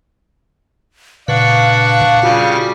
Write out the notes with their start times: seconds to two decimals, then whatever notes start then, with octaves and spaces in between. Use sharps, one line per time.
1.28 A#2 C#3 D4 B4 F5 F#5 C#6
2.23 C#3 G3 F4 F#4